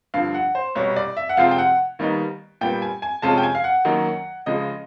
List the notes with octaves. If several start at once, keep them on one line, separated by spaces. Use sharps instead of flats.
G2 D3 F3 F5
F#5
C5
C2 B2 G3 C#5
D5
E5
F#5
C3 F3 G#3 C4 F4 F5
G5
F#5
D#2 D#3 G3 B3 D#4
A#2 G3 B3 G5
G#5
G#5
C3 F3 G#3 C#4 F4 A5
G5
G#5
F5
F#5
F#2 D#3 F#3 A#3 D#4
C#2 C#3 F3 G#3 D#5